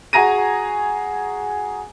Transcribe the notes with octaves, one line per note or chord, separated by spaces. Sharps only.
F#4 G#4 A#5 A#6 D#7